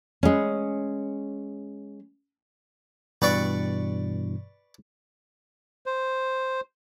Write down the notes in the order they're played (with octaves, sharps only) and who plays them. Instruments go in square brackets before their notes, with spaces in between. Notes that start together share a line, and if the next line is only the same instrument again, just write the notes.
[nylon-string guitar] G#3 C#4
[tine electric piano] G2 B2 E3 [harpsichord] B4 D5 C#6
[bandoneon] C5